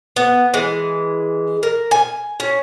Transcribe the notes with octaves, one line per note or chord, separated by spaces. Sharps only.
B3
E3 G#3
A#4
G#5
C#4